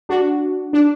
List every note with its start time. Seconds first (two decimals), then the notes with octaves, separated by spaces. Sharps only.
0.09 D4 F#4
0.73 D4